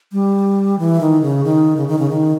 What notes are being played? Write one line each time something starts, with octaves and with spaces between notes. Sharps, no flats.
G3
E3
D#3
C#3
D#3
C#3
D#3
C#3
D#3